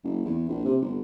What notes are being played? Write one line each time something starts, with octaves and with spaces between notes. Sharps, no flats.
F#1
E2
A#1
C3
G1